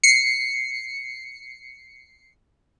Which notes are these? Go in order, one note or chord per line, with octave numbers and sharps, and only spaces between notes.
C7 C#7